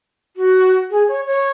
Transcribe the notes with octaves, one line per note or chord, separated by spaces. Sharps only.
F#4
G#4
C#5
C#5